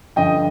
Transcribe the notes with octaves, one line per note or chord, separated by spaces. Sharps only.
G2 D3 F3 D#5 G5